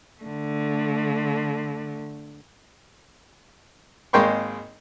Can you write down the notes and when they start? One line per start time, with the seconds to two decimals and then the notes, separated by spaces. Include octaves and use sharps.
0.22 D3 A3
4.13 G#1 G#3 A#3 G5 C6 C#6